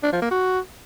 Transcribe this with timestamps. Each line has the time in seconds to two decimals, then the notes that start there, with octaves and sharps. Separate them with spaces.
0.03 D4
0.12 F3
0.22 A#3
0.31 F#4